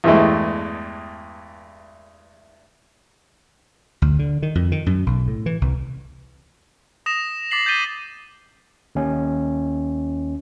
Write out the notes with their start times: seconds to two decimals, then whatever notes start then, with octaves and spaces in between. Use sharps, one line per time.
0.04 E2 G2 E3 G#3 A3
4.02 D2
4.19 D3
4.42 D#3
4.55 F2
4.72 D#3
4.86 F#2
5.06 B1
5.28 A2
5.46 E3
5.61 C2
7.06 D#6 A#6 E7
7.51 D6 A6 B6 C7 F#7
7.66 G6 A6 B6 D#7 G7
8.95 D#2 C#4